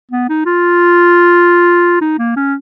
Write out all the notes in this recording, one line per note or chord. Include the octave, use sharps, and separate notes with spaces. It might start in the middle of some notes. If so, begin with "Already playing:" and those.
B3
D#4
F4
D#4
A#3
C#4